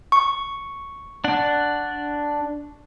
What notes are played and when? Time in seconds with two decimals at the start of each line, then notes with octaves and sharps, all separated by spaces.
0.12 C#6
1.24 D4 F#5